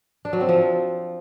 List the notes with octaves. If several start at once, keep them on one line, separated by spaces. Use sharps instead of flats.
D4
F#3
C4
F3